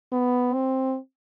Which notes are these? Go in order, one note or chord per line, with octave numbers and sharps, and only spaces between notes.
B3
C4